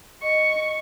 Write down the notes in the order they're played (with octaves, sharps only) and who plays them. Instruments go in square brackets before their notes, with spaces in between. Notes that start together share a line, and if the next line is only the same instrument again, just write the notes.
[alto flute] D#5 [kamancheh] C#6